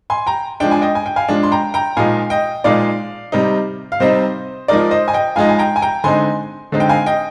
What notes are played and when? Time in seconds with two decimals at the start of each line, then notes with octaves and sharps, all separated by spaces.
0.10 G#5 C6
0.27 G5 A#5
0.60 F3 G#3 D4 G5
0.71 G#5
0.82 D#5 G5
0.95 G#5
1.06 G5
1.16 F5 G#5
1.28 F3 G#3 D4
1.43 C6
1.52 G5 A#5
1.74 G5 A#5
1.97 A#2 F3 G#3 D#4 F5 G#5
2.30 D#5 G5
2.64 A#2 F3 G#3 D#4 D5 F5
3.32 C3 G3 C4 D#4
3.92 F5
4.00 C3 G3 C4 D#4 C5 D#5
4.68 F3 G#3 D#4 A#4 D5
4.91 C5 D#5
5.08 G#5
5.13 D#5 G5
5.36 F3 G#3 D#4 F5 G#5
5.49 G#5
5.59 G5 A#5
5.76 G#5
5.82 G5 A#5
6.04 D3 G#3 C4 D#4 G#5 C6
6.72 D3 G#3 C4 D#4
6.80 G5
6.89 F5 G#5
7.06 D#5 G5